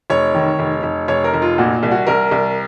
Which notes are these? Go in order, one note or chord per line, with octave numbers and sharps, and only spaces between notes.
F1 C#5
D#3
F1
F1
F1 C#5
A#4
F1
F4
A#2 F#4
C2
F#4
C2 A#4
C2